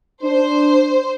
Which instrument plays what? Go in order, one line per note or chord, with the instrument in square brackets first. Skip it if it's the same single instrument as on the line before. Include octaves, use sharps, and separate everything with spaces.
[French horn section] D4 [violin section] C5